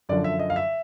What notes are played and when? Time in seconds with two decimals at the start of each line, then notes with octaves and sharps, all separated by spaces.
0.09 F#2 D3 F3 D5
0.24 E5
0.39 D#5
0.50 F5
0.56 E5